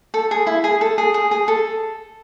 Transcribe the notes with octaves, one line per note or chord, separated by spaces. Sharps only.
A4
G#4
E4
G#4
A4
G#4
G#4
G#4
A4